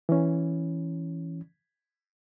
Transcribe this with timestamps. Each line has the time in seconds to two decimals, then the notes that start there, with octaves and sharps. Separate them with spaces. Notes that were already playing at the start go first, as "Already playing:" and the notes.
0.09 E3 C#4